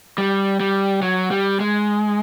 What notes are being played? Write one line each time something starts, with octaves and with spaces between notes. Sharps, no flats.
G3
G3
F#3
G3
G#3